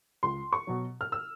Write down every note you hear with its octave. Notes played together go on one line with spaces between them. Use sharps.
C#2 C6
C#6
B2 F#3
F6
E6